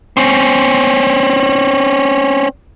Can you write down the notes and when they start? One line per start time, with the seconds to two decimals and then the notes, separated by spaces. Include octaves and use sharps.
0.17 C4 C#4